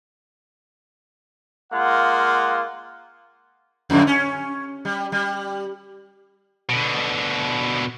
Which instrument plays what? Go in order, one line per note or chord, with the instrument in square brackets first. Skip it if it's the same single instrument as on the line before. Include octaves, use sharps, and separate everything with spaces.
[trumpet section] G#3 A#3 F4 F#5
[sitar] F2 A2 D3
C#4
G3
G3
[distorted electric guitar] B2 D3